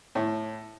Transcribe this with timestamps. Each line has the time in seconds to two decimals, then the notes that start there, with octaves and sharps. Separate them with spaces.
0.15 A2